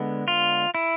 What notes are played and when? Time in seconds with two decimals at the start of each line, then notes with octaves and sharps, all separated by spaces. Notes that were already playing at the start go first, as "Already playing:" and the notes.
Already playing: D3 G#3 B3
0.28 F4
0.75 E4